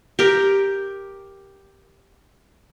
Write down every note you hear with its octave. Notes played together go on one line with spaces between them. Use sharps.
G4 A#4